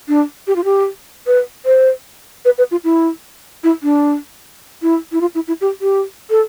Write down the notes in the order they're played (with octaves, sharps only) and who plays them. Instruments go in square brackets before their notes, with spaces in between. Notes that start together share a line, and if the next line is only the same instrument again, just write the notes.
[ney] D4
G4
F4
G4
B4
C5
B4
B4
F4
E4
E4
D4
E4
E4
F4
E4
E4
G4
G4
A4